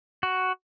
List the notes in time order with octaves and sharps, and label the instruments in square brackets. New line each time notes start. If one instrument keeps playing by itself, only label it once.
[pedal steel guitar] F#4